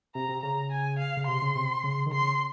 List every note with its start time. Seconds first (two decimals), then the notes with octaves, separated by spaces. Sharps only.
0.15 C3 A#5
0.29 C3
0.43 C#3 A#5
0.72 G#5
0.99 F5
1.17 C#3
1.27 C3 C6
1.42 C#3
1.55 C3
1.84 C#3
2.06 D#3
2.12 C#3 C6